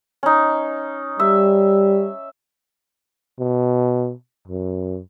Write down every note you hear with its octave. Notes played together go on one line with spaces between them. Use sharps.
C#4 D#4
G3 E5
B2
F#2